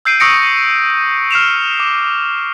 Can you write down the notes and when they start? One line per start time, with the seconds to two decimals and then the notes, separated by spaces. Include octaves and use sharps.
0.05 E6 G6 C7 D7 D#7
0.20 C#6 D#6 E6 A#6 C#7 D7
1.31 F6 C7 E7 F7
1.80 D6